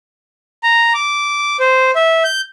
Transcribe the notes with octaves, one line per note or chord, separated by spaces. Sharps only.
A#5
D6
C5
E5
G6